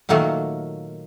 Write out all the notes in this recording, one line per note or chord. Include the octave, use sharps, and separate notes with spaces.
A#2 D#3 F#3 A3 A#3